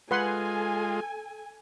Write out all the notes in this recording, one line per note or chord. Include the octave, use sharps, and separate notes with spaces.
G#3 F4 A4 B4 F#5 G#5 C6